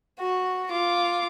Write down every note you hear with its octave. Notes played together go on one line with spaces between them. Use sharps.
F#4
F4 D6